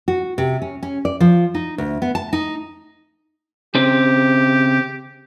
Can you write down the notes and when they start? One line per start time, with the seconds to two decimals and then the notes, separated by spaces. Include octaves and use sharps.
0.08 F#4
0.38 C3
0.62 C#4
0.83 C#4
1.05 D5
1.20 F3
1.55 D#4
1.78 D2
2.02 B3
2.15 A5
2.33 D#4
3.75 C#3 C4 G4